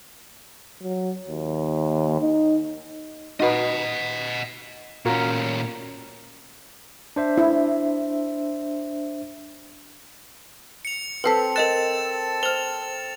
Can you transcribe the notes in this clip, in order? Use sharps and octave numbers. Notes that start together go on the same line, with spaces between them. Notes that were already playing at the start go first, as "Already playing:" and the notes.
F#3
D#2
D#4
D#4 F#4 B4 D#5 F#5
A#2 C#4 F4 F#4 A#4
D4 C5 E5
E4
C#7 F7
C4 A4 B4 G5 B6
A#4 D#5 F#6 A6 E7
C5 F6 F7